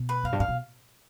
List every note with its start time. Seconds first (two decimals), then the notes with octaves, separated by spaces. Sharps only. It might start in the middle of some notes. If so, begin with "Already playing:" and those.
Already playing: B2
0.09 B4
0.24 F2 F5
0.32 G2
0.40 A2 F5
0.48 B2